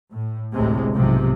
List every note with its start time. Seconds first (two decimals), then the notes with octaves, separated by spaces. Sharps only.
0.11 A2
0.52 A1 D2 A2 C3 G#3
0.93 B1 G#2 C3 F3